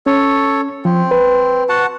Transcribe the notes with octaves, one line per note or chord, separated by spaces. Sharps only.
C#4 A4 C#5
F3 C4
B4
F#4 F#5 A5